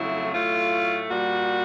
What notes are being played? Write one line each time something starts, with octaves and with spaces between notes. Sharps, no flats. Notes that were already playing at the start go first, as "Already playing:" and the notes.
Already playing: F2 C#3 F#3 A3 E4
A2 F#3 A3 F4
A#2 G3 F#4